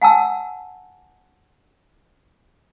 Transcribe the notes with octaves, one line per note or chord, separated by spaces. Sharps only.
F#5 G#5 A5 E6